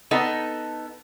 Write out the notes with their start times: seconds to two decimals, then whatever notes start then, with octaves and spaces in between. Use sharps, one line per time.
0.11 B3 D#4 A4